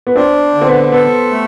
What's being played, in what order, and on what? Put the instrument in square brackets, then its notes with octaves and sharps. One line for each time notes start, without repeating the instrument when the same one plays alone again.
[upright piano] B3
[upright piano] C4 [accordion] D4
[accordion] D3
[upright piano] C4
B3
[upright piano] B3 [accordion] A4
[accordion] A3